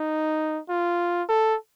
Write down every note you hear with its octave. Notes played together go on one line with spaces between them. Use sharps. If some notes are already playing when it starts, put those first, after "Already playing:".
Already playing: D#4
F4
A4